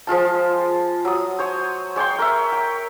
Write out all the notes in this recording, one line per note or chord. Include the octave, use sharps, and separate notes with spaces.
F3 G#3 F4 A5
F#3 D#6
C5 C#5 G#5
G#3 C#5 G5 C6
A#4 C#5 E5
G5